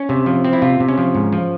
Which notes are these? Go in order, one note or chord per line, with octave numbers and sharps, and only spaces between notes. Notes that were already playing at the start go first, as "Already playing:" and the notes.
Already playing: C#4
C3
F3
C4
E4
C3 F4
C3
C#4
F3
G#2
F3